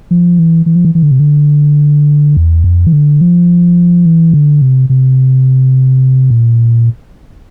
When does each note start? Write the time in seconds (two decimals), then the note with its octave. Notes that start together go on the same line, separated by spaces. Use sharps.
0.11 F3
0.39 E3
0.66 E3
0.76 F3
0.85 E3
0.95 E3
1.03 D3
1.11 C3
1.20 D3
2.36 E2
2.64 F2
2.87 E3
2.93 D3
3.21 F3
4.06 E3
4.33 D3
4.62 C3
4.90 C3
6.30 A#2